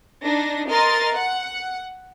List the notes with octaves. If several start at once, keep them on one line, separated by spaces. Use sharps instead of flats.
D4 D#4 A#6
A#4 D#5 C6 F6 A6
F#5